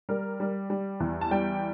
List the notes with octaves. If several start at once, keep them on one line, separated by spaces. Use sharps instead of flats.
G3 A#4
G3
G3
E2
A5
G3 G5